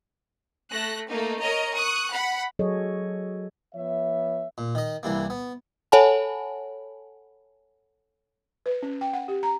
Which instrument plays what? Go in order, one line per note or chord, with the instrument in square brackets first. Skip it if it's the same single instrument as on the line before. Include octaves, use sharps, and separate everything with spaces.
[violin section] A3 F#6 A#6
A3 A#3 D#4
A#4 C#5 D#5 A#5
C#6 D#6 F#6
F#5 B5
[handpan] F#3 G#4 A4 C#5 D#5
[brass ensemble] F3 B3 C#5 E5
[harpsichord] A#2
D#3 D#5
C2 E3 G3 A#3
B3
[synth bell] A4 C#5 F#5 G#5 A5 B5
[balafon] B4
C#4
G5
F#5
G4
A#5